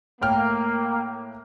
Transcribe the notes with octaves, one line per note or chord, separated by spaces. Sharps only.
A2 A#3 G5 F6